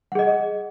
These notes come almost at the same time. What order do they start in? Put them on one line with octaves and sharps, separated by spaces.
F#5 G#4 D#5